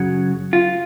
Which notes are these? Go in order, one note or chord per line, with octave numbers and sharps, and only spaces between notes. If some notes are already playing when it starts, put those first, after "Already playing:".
Already playing: F#2 C#3 F#3
F4